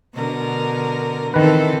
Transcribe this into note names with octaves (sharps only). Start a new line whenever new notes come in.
B2 D3 A#4
D#3 E3 C4 A4 B4